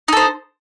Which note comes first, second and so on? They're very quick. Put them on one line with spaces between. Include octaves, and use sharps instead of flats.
D#4 A4 C5